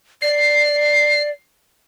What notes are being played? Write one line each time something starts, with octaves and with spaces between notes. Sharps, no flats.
D5 C7